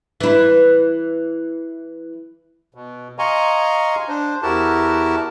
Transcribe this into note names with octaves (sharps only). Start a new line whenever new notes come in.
E3 E4
B2
D#5 F5 G#5 A#5 C6 C#6
D4 C5
E2 E4 F#4 G4 A#4 A5